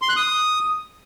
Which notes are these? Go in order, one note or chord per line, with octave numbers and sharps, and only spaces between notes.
C6
F#6
D#6